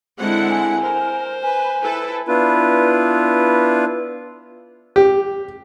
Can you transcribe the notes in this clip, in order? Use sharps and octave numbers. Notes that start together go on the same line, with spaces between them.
D3 G#3 C4 E4 F#5
G#5
A#4 C5
B4 G#5
E4 A4 B4
B3 D4 E4 F4 B4
G4